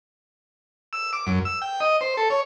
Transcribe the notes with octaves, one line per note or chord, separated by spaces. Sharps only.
E6
D6
F#2
E6
G5
D#5
C5
A4
C#5